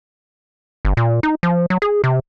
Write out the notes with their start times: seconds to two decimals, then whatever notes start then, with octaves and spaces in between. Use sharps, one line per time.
0.85 G1
0.97 A#2
1.23 D#4
1.43 F3
1.70 F#3
1.82 G#4
2.04 C3